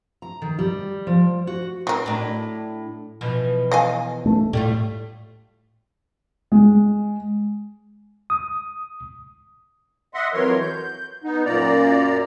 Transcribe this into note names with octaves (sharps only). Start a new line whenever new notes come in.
A#5
D#3
G3
F3
F#4
F#3 C4 A#4
A2 D4
B2 E3 F3
D#5 F5 G#5
A3
A2 G3 A3 F4
G#3
D#6
D#5 E5 F#5 C6
F2 E3 F#3 A#4 C#5 C6
G6
B3 D#4
F#2 A#2 A#3 D5 A#5